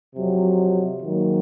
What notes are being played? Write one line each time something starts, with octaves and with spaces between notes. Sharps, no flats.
F2 C3 F#3
G#2 D#3 F#3 A#3